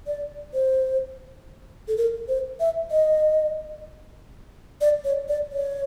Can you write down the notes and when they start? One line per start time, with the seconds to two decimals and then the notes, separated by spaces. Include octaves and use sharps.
0.07 D5
0.54 C5
1.88 A4
1.97 A#4
2.28 C5
2.60 E5
2.91 D#5
4.81 D5
5.05 C#5
5.28 D5
5.52 C#5